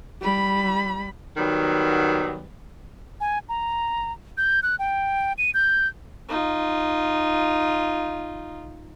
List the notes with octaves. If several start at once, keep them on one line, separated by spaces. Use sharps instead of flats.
G3 B5
D#3 F#3 G3 B3
G#5
A#5
G6
F#6
G5
D#7
G6
D#4 F4